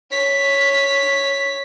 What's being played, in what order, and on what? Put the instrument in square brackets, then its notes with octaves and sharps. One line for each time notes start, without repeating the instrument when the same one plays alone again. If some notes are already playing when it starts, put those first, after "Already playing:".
[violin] C#5 B6